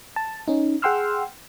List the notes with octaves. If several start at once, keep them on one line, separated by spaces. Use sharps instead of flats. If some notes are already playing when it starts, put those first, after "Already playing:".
A5
C#4 D#4
G#4 F#5 G5 C6 E6 F6